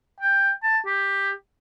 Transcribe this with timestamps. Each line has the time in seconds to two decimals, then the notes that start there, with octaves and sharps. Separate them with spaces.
0.20 G5
0.63 A5
0.85 G4